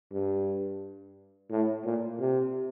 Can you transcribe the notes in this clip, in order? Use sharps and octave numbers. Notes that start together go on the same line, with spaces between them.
G2
A2
A#2
C3